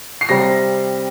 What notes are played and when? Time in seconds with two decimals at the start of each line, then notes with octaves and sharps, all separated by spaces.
0.21 C7
0.29 C3 G3 C4 A#6